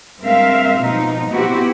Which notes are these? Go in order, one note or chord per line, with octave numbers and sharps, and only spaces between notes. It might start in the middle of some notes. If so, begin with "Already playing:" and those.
G2 G#3 C4 A#4 E5 F5
B2 F3 D#4
B3 C4 E4 F#4 G4